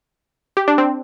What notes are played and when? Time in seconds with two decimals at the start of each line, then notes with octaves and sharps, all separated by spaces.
0.57 G4
0.68 D4
0.78 C4